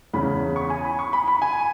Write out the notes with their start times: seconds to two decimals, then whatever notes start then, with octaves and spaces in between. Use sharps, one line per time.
0.13 E2 C#3 E3 C#4 B5
0.56 C#6
0.70 G#5
0.84 B5
0.99 C#6
1.13 B5
1.28 B5
1.42 G#5